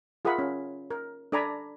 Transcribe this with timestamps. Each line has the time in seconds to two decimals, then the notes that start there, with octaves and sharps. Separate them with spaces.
0.25 F4 G#4 A#4 E5 F#5 B5
0.39 C#4
0.91 A#4
1.32 D4 A4 D5 G#5 A#5 B5